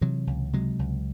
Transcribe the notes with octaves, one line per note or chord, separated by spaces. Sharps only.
C3 E3 F#3
C#2
C3 F#3 G#3
C#2